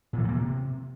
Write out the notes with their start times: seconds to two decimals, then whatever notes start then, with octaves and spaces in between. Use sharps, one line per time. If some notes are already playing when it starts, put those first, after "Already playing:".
0.13 A#2
0.18 E3
0.23 G2
0.29 A#3
0.34 C3